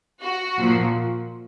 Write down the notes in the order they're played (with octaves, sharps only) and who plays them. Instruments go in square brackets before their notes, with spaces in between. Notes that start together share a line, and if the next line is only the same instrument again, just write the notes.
[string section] F#4
A#2 F3